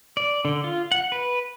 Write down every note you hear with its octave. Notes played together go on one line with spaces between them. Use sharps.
D5
D3
F4
F#5
B4